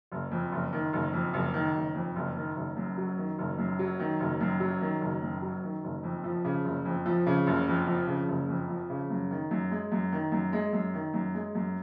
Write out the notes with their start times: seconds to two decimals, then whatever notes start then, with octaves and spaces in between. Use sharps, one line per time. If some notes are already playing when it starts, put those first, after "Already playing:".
0.12 F#1
0.31 F2
0.52 F#1
0.73 D#3
0.93 F#1
1.13 F2
1.34 F#1
1.54 D#3
1.75 F#1
1.95 F2
2.16 F#1
2.36 D#3
2.56 F#1
2.77 F#2
2.98 F#3
3.18 D#3
3.38 F#1
3.58 F#2
3.79 F#3
3.99 D#3
4.20 F#1
4.41 F#2
4.60 F#3
4.81 D#3
5.01 F#1
5.22 F#2
5.42 F#3
5.63 D#3
5.84 F#1
6.04 F2
6.24 F3
6.44 C#3
6.65 F#1
6.85 F2
7.06 F3
7.26 C#3
7.47 F#1
7.67 F2
7.87 F3
8.07 C#3
8.28 F#1
8.48 F2
8.69 F3
8.90 C#3
9.10 F#2
9.31 D#3
9.51 F#2
9.71 G#3
9.92 F#2
10.12 D#3
10.32 F#2
10.53 G#3
10.73 F#2
10.94 D#3
11.14 F#2
11.34 G#3
11.55 F#2